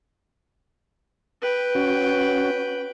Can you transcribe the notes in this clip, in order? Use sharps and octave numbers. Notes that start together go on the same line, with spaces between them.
B4 G5
C#4 F#4